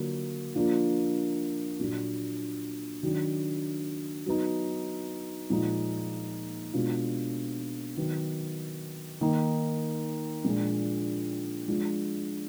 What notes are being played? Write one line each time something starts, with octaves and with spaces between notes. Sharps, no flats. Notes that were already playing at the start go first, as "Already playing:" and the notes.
Already playing: D3 F#3 A#3 F4
F3 A#3 D4 F4
A#2 F#3 D4
D#3 F#3 D4
F#3 B3 D#4
A#2 F3 G#3 D#4
B2 G#3 D4 F4
D#3 F#3 B3
D#3 A#3 D#4
A#2 F3 G#3 D4
F3 G#3 D4 F4